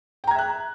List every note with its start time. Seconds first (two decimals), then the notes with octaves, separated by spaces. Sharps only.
0.24 G5
0.27 A#5
0.31 G#6
0.35 E5
0.38 F#6